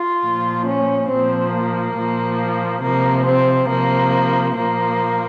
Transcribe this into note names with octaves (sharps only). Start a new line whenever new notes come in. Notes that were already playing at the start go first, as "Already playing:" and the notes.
Already playing: F4
A#2 F3
C#4
A#2 F3 C4
A#3
A#2 F3
C3 F3 A#3
C4
C3 F3 A#3
A#2 F3 A#3